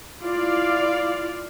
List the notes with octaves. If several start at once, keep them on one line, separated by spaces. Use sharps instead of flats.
E4 F4 D5 F5